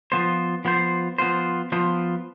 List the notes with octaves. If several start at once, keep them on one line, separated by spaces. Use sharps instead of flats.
F3 B3 F4 C5
F3 B3 F4 C5
F3 B3 F4 C5
F3 B3 F4 C5